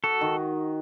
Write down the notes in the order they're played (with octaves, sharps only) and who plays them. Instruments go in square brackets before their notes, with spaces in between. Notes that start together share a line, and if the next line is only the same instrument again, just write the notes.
[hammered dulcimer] F#4 [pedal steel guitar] A4
[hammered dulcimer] D#3